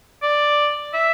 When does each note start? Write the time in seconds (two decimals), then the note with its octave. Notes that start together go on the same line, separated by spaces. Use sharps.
0.23 D5
0.94 E5